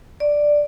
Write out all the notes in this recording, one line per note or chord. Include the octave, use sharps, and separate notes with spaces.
D5